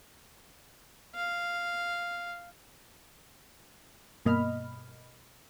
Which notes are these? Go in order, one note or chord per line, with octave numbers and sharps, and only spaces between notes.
F5
G2 B2 A#3 D#5 B5 F6